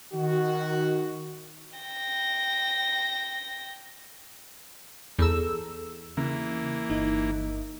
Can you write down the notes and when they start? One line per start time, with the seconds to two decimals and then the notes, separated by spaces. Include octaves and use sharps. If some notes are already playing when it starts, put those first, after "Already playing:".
0.13 D#3 F#4
1.76 G5 A#6
5.18 E2 G#4 A4 A#5 E6
6.17 C#3 E3 A#3
6.90 G1 D#4 D#5